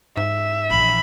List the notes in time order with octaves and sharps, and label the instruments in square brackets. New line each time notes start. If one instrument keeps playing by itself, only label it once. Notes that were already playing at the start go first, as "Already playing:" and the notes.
[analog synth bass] G#2 [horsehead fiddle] E5
[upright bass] A#1 E3 [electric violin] B5